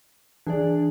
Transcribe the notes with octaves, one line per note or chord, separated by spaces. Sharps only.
E3 D4 G#4 D5